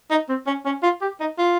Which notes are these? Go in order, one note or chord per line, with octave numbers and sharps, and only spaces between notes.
D#4
C4
C#4
C#4
F4
G4
D#4
F4